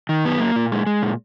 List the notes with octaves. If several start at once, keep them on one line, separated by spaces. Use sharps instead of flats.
D#3
F#2 B3
A#3
A#2
G#3
G#3
A#2